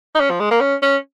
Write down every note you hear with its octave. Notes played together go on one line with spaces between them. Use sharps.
D#4
C#4
F3
G#3
A#3
C#4
C#4